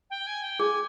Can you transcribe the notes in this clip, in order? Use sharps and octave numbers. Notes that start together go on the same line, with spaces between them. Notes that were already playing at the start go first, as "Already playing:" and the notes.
G5
G#5
G5
G#4 G#5